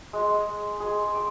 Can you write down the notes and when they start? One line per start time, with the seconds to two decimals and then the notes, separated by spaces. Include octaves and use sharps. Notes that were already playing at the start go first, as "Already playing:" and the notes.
0.13 G#3
0.80 G#4 C6
1.14 D6